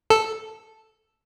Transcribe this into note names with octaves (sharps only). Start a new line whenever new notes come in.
A4